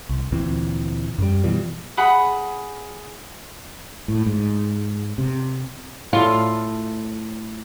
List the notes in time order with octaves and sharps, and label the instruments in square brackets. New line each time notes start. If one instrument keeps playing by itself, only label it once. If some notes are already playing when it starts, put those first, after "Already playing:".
[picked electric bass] C2
D2 A#2 E3 C4
F#2 G3
B2 E3 F3 G3
[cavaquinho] G#4 F#5 B5 D#6
[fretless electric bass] A2
G#2
C3
[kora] A2 A4 [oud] F4